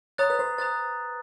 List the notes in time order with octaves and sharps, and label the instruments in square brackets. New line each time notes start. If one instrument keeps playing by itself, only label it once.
[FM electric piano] C#5 [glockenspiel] A#5 D#6 F#6 A6
[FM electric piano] B4
C5
[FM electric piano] C5 [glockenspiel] A#5 D#6 F#6 A6